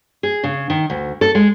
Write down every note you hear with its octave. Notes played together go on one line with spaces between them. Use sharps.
G#4
C#3
D#3
D2
A4
G#3